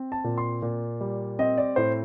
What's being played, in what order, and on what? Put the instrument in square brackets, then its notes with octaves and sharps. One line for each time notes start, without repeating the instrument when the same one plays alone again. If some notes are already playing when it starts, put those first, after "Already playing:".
Already playing: [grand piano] C4
A5
A#2
C6
A#2
G3
C4 D#5
D5
A2 C5